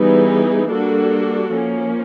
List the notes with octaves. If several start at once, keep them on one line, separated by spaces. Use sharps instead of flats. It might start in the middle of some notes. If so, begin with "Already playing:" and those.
Already playing: E3 G3 B3 D#4 G#4
G3 A#3 D4 F#4 A4
F3 A#3 C#4